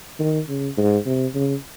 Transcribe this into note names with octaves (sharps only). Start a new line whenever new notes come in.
D#3
C#3
G#2
C3
C#3